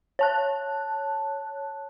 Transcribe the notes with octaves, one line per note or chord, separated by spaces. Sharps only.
C#5 A5 F#6